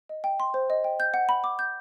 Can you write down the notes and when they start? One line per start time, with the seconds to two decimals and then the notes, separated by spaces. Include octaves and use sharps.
0.09 D#5
0.24 G5
0.40 C6
0.54 C5
0.70 D#5
0.84 G5
1.00 G6
1.14 F#5
1.29 B5
1.44 D6
1.59 G6